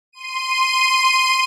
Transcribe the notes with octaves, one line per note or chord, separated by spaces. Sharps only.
C6 D#7